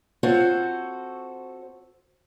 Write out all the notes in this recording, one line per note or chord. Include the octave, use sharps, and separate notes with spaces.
C4 F4 F#4 A4 C5 C#5